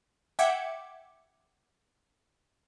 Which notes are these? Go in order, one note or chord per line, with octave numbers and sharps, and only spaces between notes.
E5 F#5 G5 D6 G#6 C#7